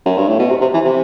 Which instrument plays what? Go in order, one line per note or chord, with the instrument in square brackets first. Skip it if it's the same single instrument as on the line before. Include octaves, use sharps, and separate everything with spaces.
[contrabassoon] F#2
G2
A2
B2
C3
C3
E3
C3